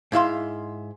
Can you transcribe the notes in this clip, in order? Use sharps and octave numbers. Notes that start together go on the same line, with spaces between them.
G#2 E4 F5 C6